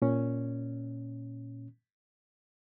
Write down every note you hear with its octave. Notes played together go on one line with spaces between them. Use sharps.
A#2 C#4